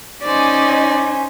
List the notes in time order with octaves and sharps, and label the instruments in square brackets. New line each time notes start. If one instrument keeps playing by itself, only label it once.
[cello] C#4 D#4 [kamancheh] C5 G#5 [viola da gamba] D5